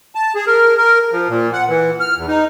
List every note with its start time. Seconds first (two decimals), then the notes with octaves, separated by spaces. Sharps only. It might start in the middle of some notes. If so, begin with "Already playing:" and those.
0.15 A5
0.35 G#4
0.47 A#4
0.78 A#4
1.12 F3
1.29 A#2
1.53 F#5
1.68 E3
2.00 F6
2.16 E2
2.28 D#4